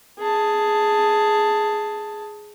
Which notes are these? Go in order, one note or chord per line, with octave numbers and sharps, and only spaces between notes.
G#4 A5